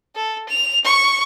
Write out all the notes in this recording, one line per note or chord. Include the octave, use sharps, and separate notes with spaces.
A4
F7
C#6